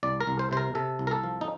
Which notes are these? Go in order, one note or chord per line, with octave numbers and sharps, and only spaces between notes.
C2 D5
A#4
C2
C5
C3 C5
A#4
C3 A4
C2
A#4
A4
F3
D#4